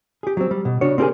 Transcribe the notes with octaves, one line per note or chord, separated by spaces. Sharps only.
G4 G#4
F#3 C4
G3
B2
C#3 D4 F#4 C#5
C4 C#4 G4 G#4 A#4 G#5